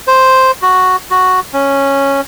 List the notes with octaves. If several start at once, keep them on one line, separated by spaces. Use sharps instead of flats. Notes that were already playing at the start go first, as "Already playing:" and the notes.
C5
F#4
F#4
C#4